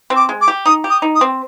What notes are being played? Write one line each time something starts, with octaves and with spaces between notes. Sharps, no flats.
C4
D6
G#3
D6
G4
D#4 D#6
G4
D#6
D#4
D#6
C4